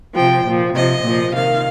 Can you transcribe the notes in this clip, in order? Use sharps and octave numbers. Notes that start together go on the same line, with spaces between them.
C3 F3 G5
A#2 F3
C3 F3 D#5
A#2 F3
C3 D#3 F5